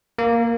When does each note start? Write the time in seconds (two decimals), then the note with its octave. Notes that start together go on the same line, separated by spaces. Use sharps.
0.18 A#3